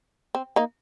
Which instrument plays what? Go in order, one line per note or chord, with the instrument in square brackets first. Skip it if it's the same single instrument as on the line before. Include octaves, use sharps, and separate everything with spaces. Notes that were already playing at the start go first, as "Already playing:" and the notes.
[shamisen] C4
A#3 D#4